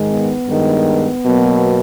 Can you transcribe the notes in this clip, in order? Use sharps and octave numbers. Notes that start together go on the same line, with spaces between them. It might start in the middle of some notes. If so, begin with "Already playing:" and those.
Already playing: G#2 D#3 G#3
B3
G2 D#3 G#3
B2 F#3 A#3